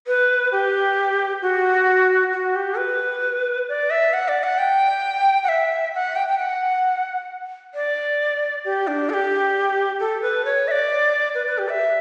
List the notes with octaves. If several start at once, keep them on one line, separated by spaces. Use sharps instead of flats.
B4
G4
F#4
F#4
G4
B4
D5
E5
F#5
D5
F#5
G5
F#5
E5
F#5
G5
G5
F#5
D5
G4
D4
A4
G4
A4
B4
C#5
E5
D5
B4
B4
G4
E5